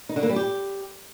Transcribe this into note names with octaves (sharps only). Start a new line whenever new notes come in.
D#4
D3
A#3
G3
G4